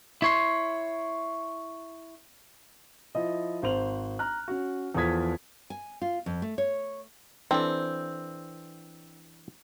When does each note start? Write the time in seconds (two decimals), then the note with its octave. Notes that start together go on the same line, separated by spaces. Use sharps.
0.22 E4 C#5 C6
3.15 F3 E4 D#5
3.62 G#1 C5 F7 F#7
4.19 A#5 F6 F#6
4.48 C#4 F#4
4.95 E2 F3 A4 D#6 G#6 B6
5.70 G#5
6.02 F4
6.26 F2
6.42 A3
6.58 C#5
7.51 E3 C4 D4 A4